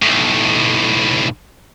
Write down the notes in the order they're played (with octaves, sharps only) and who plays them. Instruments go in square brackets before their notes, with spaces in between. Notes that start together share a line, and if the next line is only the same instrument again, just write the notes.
[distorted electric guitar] B1 A2